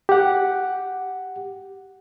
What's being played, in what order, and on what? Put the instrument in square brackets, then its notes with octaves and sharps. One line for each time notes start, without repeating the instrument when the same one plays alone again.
[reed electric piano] G4 F#5